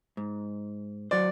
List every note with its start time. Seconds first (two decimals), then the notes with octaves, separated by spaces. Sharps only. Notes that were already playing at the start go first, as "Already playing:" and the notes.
0.17 G#2
1.11 F#3 C5 D5